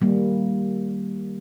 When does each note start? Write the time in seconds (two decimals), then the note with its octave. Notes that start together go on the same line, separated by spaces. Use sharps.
0.01 D#3 G3 A#3